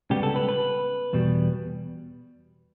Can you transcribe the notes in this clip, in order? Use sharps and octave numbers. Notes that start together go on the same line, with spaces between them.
C#2 C#3 G3 B3 G4
A4
B4
B4
E2 B2 G3